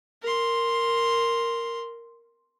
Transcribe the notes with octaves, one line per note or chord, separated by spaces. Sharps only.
A#4 C6